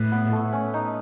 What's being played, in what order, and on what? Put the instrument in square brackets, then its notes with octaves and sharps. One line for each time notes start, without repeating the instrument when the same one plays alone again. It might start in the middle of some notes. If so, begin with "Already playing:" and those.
Already playing: [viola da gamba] A2 [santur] E4 B4
[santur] B3
A3
C#4
D#4